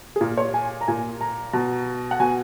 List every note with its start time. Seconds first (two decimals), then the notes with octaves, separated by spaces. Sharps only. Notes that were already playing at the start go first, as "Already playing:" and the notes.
0.16 G#4
0.21 A#2 A#4
0.37 C#5
0.54 G#5
0.81 A#5
0.88 A#2 G#5
1.21 A#5
1.53 B2
2.11 F#5
2.20 B2 G#5